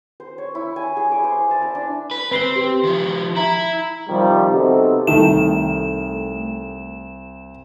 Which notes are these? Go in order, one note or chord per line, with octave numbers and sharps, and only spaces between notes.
C5
C#5
E4
G#5
G#4
D6
C5
A5
A#5
D4
B4
C4 B4 C7 G7
G4
D#3 F3
E4 A#5
C3 D#3 F3 G3
C3 B3 C4 D#4 F#4 A4
C2 D#3 A3 G5 E7